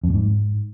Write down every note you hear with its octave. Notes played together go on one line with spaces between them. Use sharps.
F2
A#2
G#2